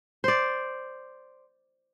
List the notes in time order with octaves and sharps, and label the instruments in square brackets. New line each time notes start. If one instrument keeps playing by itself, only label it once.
[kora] C5 D5